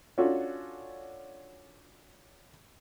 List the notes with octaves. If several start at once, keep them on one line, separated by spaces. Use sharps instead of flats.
C#4 D4 F4 F#4 A4